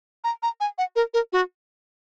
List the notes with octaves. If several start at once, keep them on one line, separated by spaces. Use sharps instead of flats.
A#5
A#5
G#5
F#5
A#4
A#4
F#4